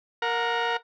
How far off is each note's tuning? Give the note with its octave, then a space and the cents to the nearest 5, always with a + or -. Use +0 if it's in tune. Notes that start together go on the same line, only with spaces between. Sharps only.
A#4 +0 F#5 -35